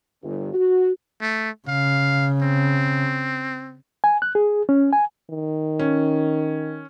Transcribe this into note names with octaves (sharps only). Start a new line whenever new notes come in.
G1
F#4
A3
C#3 F5
C4
G#5
F#6
G#4
C#4
G#5
D#3
C#4